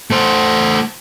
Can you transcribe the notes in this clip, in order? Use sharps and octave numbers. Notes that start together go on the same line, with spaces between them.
A3 C5